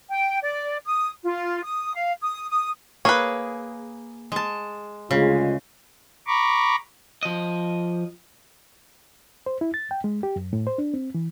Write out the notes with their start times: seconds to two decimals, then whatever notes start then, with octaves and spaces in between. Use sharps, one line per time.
0.10 G5
0.42 D5
0.85 D#6
1.23 F4
1.63 D#6
1.95 F5
2.21 D#6
2.49 D#6
3.05 A#3 G#4 B4 C#5
4.32 G#3 A5
5.11 D2 C#3 G#3 F4
6.27 A#5 B5 C#6 D6
7.23 F3 D#5
9.46 C5
9.61 E4
9.74 A6
9.91 G5
10.04 G#3
10.23 G4
10.36 F#2
10.53 A2
10.67 C5
10.78 D4
10.94 C4
11.14 E3